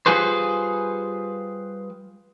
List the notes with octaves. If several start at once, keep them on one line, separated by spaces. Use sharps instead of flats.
G3 F4 G#4 B4 C5